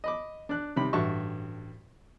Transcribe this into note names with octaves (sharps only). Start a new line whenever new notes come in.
D#5 B5 D6
D4 F#6
C3 D#3 G3 B5
A1 G2 F#4 E5 A5 C#6